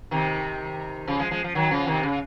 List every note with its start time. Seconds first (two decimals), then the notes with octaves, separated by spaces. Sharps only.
0.11 C3 D#3
1.07 C#3 F3
1.19 F3 G#3
1.31 F3 G#3
1.44 F3
1.55 D#3 F#3
1.71 C#3 F3
1.87 C3 D#3
2.03 C#3